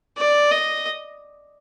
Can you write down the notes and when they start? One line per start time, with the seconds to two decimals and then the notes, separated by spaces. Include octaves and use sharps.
0.18 D5
0.51 D#5